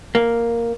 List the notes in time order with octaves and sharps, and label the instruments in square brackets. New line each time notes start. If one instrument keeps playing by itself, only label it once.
[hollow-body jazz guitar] A#3